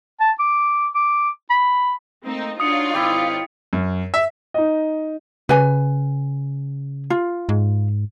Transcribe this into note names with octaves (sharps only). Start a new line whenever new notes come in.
A5
D6
D6
B5
A3 A#3 C4 D#4 D#5
D4 D#4 F4 F#4 C#5 D#6 C#7
G#1 C4 E4 G4 D5 F5
F#2
E5
D#4 D#5
C#3 B4 G#5
F4
G#2